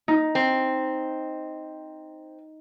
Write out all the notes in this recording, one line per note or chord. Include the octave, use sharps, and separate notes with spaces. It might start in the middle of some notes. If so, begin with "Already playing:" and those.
D#4
C4